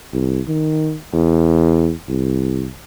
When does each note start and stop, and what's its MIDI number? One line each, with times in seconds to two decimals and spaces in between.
0.13 0.40 36
0.48 0.96 51
1.13 1.92 40
2.09 2.69 36